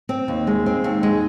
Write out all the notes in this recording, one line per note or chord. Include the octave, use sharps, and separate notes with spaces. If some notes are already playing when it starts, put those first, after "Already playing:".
C4
D#2
G#3
C4
D#2
G#3